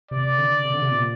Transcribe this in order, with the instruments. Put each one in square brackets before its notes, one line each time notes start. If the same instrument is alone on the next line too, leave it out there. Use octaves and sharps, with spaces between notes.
[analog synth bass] C3 [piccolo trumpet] D5
[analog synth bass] D3
C3
D3
C3
A#2